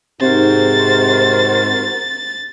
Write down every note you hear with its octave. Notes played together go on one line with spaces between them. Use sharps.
G#2 C3 F#4 A#4 C5 A6